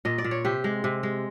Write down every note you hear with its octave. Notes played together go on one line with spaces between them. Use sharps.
A#2 D#5
D5
A#2
C#5
C3 G4
G#3
C3
G#3